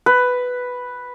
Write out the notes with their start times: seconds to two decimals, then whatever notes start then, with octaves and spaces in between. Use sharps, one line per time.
0.06 B4